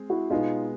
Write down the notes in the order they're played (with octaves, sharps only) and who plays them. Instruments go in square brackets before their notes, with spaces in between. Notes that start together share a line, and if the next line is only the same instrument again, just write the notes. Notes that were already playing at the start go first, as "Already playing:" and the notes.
Already playing: [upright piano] G#3 C4
[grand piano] E4 F#4
[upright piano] B2 G#3 B3 [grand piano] D#4 F4